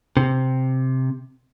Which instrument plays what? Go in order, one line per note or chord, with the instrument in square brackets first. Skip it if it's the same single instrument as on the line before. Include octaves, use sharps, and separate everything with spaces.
[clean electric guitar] C3